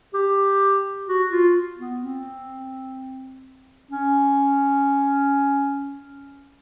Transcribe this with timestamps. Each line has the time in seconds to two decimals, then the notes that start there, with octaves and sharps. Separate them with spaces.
0.14 G4
1.08 F#4
1.32 F4
1.79 B3
2.02 C4
3.91 C#4